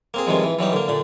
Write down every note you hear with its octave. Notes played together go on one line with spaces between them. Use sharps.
A#3 C4 G#4
G2 C3 D#3 F3 G#3
E3
E3 F#3 G3 D#4
D3 A#3
A#2 D3